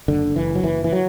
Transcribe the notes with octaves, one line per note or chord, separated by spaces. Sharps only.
F#1 D3
F#1 E3
F#3
F#1 E3
E3
F#3